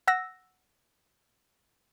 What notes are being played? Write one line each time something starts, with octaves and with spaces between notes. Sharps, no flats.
F#5 E6 A#6